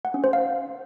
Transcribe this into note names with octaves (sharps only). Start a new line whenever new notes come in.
F#5
C#4
C5
F5